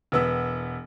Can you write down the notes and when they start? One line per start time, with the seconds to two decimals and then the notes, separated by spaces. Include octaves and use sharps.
0.12 E1 B3 E6